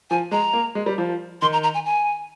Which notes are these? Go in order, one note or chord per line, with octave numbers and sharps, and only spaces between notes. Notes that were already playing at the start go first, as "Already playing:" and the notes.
F3 G#5
G#3 A#5
A#3
G#3
G3
F3
D#3 C6
A#5
A#5
G#5
G#5